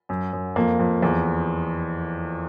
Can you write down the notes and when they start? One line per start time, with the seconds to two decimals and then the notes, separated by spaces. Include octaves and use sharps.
0.09 F#2
0.33 F#2
0.56 F2 A#3
0.79 F2
1.02 E2